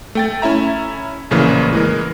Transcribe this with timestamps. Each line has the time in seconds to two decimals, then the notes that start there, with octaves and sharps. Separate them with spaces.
0.15 A3 G5 A6
0.42 C#4 E4 E5 A#5
1.31 A#1 A2 C#3 E3 A#3
1.73 E3 G#3 A#4